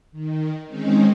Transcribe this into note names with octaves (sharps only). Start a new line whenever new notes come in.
D#3
D#3 G#3 C4 C#4 D#4